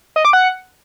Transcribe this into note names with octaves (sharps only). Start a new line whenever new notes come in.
D#5
D6
F#5